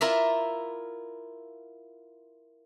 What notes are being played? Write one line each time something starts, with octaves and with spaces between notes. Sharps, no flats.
E4 F4 A#4 D5 E5